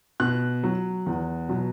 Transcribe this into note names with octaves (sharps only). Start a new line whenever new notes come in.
B2 F#6
F#3
E2
B2 F#3